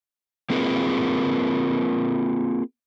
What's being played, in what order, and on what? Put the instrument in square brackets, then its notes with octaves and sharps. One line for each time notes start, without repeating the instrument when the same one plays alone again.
[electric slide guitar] A#3 C4 F4 G#4 A#4 B4